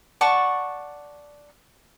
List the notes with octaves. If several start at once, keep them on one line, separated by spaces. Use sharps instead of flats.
D5 F#5 A5 C#6